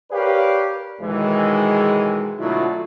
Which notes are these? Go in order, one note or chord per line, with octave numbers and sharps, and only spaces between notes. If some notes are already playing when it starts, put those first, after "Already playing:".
G4 A#4 B4 C#5 D5 F5
B1 D#3 E3 G#3
B2 D3 F#3 A3 E4 F4